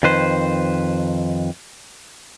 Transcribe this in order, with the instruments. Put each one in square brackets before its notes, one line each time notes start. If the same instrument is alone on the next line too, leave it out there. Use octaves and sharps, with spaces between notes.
[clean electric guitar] F2 D#3 B4 C5